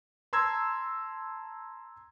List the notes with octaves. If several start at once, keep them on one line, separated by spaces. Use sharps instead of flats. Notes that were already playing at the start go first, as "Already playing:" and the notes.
A5 A#5 C6 E6 G#6